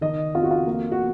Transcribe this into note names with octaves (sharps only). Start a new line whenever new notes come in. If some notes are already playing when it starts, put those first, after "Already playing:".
D#3 D#5
F2 F4
F#4
F4
A#3
F#4